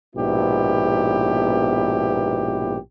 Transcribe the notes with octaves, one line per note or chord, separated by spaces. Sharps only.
A#1 G#2 B2 B3 E4 G4